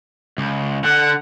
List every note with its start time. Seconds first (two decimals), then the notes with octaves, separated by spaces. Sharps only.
0.38 C#2
0.84 D3 F#5